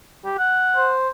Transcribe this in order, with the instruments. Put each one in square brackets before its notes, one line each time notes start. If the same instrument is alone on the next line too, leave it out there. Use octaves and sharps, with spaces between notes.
[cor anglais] G4
F#5
[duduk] C5